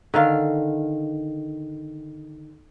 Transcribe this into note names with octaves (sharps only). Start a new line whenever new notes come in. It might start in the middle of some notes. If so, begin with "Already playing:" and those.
D3 D#3 F5